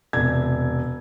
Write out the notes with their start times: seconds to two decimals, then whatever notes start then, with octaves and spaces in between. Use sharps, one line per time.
0.13 E1 C3 G#6